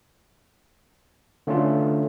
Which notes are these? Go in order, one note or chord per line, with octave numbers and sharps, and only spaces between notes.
D3 A3 C#4 D4 F4